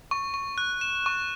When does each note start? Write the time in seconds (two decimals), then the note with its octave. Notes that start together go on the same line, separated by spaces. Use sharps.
0.11 C#6
0.34 C#6
0.58 F#6
0.81 E7
1.06 C#6